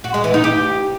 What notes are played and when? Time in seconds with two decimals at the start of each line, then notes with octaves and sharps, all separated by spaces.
0.04 F#4
0.14 G#3
0.24 E3
0.34 D#4
0.44 G4